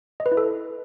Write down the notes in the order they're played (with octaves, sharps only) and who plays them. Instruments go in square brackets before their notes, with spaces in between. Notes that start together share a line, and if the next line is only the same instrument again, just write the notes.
[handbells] D#5
B4
E4
A4